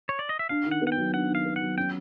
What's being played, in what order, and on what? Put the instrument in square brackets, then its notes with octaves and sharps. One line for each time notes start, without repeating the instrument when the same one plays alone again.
[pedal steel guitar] C#5
D5
D#5
E5
[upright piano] D4 [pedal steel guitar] F5
[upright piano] D#3
[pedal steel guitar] F#5
[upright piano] B3
[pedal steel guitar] F#5
G5
[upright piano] F#3
[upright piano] D4 [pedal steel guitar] F#5
[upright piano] D#3 [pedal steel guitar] F5
[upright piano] B3
[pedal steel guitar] F#5
[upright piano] F#3
[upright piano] C#4 [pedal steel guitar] G5